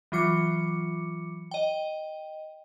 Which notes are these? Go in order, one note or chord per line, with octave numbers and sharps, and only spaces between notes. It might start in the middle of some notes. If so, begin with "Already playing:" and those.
E3 F#3 F4 D6 C#7
D#5 G5